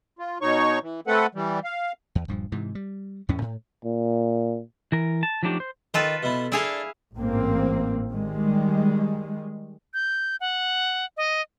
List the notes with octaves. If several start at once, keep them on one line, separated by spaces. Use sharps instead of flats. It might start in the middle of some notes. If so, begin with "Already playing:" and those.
F4
B2 D#4 C#5 C#6
E3
A3 C4 A4 B4 F#5
E3 G3
F5
E2
D#1 G2 F3
G#2 C3 E3
G3
E2 A2 A3 C#4
A2
A#2
E3 A#4
A5
F3 F#3 A3 D4 D#4 G4
C5
D#3 F4 A4 B4
B2 E4
D4 E4 G#4 A4 F5
A1 G#2 A#3 C4
D#3 G3 G#3
G6
F#5
D#5